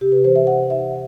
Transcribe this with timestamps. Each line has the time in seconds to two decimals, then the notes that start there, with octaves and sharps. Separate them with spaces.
0.01 C3 G4
0.12 B4
0.24 E3 C5
0.36 E5
0.47 D#4 F#5
0.70 D#4 E5